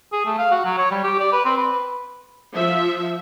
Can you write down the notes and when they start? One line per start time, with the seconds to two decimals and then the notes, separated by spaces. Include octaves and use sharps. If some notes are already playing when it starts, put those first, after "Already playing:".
0.12 G#4
0.26 A3
0.38 F5
0.51 F#4
0.65 F#3
0.78 C#5
0.91 G3
1.03 G4
1.20 D5
1.33 B4
1.45 C4
1.57 B4
2.53 F3 E5